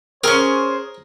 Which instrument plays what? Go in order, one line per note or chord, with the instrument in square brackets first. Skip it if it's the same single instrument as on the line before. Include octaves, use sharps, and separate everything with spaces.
[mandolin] C4 C#4 [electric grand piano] G#4 [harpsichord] A#4 [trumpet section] C5